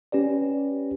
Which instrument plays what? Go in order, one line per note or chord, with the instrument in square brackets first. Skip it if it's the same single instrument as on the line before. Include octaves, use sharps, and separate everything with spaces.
[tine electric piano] C#4 G4 B4 D5